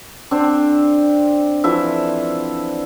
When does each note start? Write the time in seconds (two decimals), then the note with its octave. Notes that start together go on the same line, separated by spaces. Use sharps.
0.31 C4 D4
1.64 E3 F3 E5